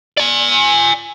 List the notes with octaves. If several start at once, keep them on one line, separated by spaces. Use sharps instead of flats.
D5 G#5